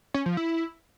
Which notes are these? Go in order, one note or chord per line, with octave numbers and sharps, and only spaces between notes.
C#4
F3
E4